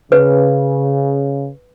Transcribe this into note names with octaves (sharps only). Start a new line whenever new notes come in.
C#3 B4